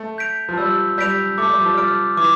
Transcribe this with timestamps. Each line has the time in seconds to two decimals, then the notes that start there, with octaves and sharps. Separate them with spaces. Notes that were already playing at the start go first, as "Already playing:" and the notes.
Already playing: A3
0.18 G6 B6 D7 F7
0.49 F3
0.58 G3 E6
0.98 G3 G6 B6 D7 F7
1.38 A3 D6
1.50 G3
1.61 F3
1.74 G3 F6 A6 D7
2.17 E3 D6